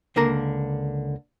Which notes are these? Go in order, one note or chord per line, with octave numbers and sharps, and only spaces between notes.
C#2 D3 A#3 A#4 A#5